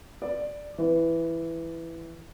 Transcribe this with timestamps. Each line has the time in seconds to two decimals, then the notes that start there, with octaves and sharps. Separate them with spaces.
0.22 D5
0.78 E3